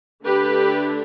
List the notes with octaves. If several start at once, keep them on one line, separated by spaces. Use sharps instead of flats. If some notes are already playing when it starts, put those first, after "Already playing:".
D3 A3 D4 G4 B4